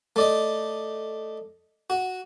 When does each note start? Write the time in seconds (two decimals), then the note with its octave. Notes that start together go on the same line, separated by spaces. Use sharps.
0.16 A3 D5 D#5
1.90 F#4